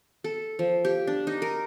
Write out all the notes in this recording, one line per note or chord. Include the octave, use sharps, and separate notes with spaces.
A4
F3
G4
D4
D#4
A#4